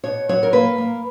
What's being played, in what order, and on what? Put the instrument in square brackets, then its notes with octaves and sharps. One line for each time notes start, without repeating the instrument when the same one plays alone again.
[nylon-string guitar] B2 C#5
F#3 C#5
A#4
A#3 B4
A#3